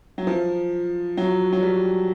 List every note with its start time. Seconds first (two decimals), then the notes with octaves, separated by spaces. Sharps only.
0.18 F#3
0.27 F3
1.17 F#3
1.52 F#3
1.63 G3